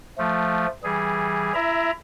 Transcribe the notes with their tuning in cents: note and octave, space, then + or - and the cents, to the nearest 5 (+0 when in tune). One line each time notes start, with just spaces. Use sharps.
F3 +0 A3 +0
E3 +0 G3 -10 G#4 +0
E4 +25 E5 +0 A#5 +15